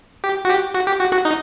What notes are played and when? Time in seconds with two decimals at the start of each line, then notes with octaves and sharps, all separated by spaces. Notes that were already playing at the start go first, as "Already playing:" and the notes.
0.24 G4
0.45 F#4
0.49 G4
0.75 F#4
0.87 G4
0.99 F#4
1.12 F#4
1.25 D#4